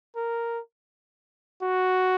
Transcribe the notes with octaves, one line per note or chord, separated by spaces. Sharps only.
A#4
F#4